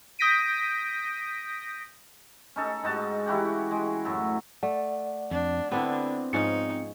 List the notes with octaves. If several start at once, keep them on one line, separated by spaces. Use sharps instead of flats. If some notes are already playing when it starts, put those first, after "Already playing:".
D#6 G6 A#6 B6 D7 D#7
C#4 D#4 A4
G#2 D#4 F#4 A5
E3 E4 F#4 G4
G#3
F#2 A2 F#3
A3 D5 F#5
F2 D4
D3 B3 C4 D4 E4
G#2 F3 C#4 D#4 C#7